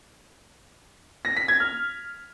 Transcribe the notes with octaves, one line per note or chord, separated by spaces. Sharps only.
A#6
B6
G#6
F6